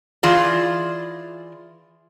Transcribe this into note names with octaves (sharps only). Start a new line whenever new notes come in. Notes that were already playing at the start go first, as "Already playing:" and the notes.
E3 F4 G#4 D5